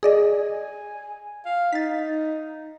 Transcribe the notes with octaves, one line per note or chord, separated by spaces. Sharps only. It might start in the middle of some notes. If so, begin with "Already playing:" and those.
G#4 D5 D#5
G#5
F5
D#4 A6 B6